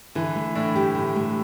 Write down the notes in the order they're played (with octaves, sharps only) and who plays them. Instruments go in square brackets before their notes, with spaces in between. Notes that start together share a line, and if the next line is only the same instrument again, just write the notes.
[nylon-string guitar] D3 [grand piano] E3
[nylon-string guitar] A3
[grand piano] A2 [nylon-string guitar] D4
[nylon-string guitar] G4
D3
A3